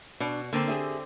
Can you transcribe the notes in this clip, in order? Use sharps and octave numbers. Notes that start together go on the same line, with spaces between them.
B2 D4
D3 A#3 C4
G4 G#4 E5